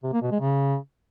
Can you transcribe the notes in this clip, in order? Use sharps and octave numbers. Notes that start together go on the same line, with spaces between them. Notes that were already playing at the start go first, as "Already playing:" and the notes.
C3
A#3
B2
G#3
C#3